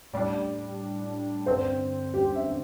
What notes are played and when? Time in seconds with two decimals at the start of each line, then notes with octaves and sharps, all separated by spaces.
0.13 A2 G3 D4 D5
1.46 G2 D3 C4 C5
2.14 G4
2.35 E5